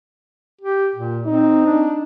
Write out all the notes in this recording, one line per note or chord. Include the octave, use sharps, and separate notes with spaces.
G4
A#2
C4 D#4
D4